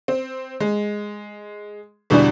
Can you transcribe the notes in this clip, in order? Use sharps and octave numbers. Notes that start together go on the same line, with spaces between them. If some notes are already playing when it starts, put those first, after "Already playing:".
C4
G#3
E2 B2 D3 E3 G3 D4